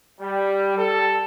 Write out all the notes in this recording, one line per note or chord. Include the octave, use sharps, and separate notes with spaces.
G3
G4 A4